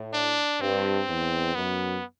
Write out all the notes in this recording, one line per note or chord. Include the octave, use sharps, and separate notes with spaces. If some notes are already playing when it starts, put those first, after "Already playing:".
Already playing: A2
D4
G2 C4
E2
F#2 B3